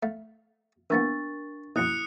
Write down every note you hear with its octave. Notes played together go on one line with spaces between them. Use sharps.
A3 F5
E3 A#3 B3 D4 A#4 F5 C#6 A6
A#1 F#2 E4 D#6 F#6 C#7